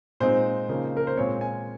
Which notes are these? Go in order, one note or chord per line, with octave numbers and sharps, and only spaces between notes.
A#2 G#3 C4 D#4 C5
C#3 F3 A#3 D#4
A#4
C5
A#2 G#3 C4 C#5
G#5